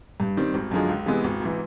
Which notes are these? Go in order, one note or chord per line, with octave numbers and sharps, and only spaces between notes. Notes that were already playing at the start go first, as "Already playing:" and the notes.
G2
D#3 G3 C4
G#1
F#2 D3 F3 G#3
C#2
C3 E3 G#3 B3
G#1
G#2 E3